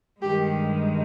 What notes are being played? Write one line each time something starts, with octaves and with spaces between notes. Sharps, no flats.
G2 D#3 G#3 G4